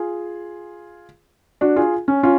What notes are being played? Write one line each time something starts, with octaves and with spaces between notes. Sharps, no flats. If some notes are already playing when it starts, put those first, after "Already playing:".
Already playing: F4 G#4
D4 F#4
F4 G#4
C#4
C#4 F4